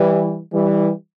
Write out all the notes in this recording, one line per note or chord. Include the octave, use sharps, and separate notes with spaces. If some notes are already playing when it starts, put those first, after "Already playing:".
Already playing: E3 G3
E3 G3